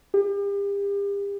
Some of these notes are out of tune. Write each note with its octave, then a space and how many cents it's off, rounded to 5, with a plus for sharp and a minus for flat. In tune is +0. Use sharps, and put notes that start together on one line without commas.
G4 +40